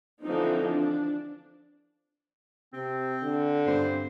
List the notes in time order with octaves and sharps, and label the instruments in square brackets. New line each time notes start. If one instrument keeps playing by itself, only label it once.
[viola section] D3 E3 F3 C4 D#4
D4
[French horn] C3 [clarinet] C4
[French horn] D3
[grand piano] G2 C4 [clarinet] C5